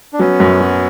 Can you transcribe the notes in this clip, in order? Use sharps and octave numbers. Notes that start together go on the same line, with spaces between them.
D4
F#3 B3 C#4
F#2
F#3